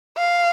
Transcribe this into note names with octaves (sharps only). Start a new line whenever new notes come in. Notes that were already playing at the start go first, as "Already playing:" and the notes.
F5